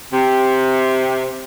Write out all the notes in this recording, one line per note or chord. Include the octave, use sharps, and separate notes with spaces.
C3